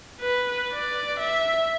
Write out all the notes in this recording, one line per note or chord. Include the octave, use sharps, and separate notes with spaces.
B4
D5
E5